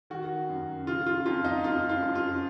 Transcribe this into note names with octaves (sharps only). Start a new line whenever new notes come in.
D#3 F#4
F#2
C#3 F4
F4
F2 F4
D#4
F#2 F4
F4
F#2
F4